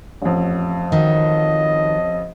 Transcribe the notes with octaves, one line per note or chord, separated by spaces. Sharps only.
A1 F2
D#3 F#4 D#5